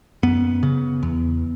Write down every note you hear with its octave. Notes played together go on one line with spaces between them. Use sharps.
F#2 B3
C#3
E2